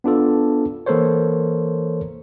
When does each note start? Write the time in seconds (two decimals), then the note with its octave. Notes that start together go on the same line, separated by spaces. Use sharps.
0.04 B3 D4 F4 A4
0.86 E3 A#3 A4 A#4 C5 C#5